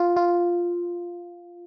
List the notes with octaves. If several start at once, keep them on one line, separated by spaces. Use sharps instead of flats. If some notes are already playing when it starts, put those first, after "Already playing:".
Already playing: F4
F4